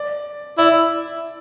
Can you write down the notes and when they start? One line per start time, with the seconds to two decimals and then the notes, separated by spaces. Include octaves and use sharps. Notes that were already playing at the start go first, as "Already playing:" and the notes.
Already playing: D5
0.58 E4 D5